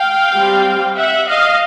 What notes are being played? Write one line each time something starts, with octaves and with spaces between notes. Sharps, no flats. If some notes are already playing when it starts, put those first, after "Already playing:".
Already playing: F5 G5
G3 C4
E5 F#5
D#5 F5